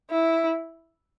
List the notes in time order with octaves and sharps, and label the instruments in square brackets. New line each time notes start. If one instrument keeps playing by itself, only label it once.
[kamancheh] E4